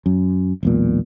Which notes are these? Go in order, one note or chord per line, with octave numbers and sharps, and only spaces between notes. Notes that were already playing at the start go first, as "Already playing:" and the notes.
F#2
E1 B1 A#2